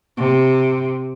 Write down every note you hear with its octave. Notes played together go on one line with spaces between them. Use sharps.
C3